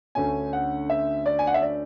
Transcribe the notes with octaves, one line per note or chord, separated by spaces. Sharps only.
D2 D3 A3 C#4 G#5
F#5
E5
D5
G#5
F#5
E5
D5